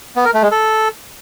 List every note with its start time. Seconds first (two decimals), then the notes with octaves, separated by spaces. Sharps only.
0.16 B3
0.25 A#4
0.34 A3
0.43 G#3
0.52 A4